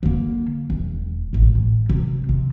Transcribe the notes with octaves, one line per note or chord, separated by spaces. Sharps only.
D3 A#3
E1
E1 A1
A2
C3
C3